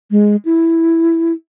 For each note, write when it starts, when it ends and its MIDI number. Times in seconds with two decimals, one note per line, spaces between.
0.11 0.36 56
0.45 1.33 64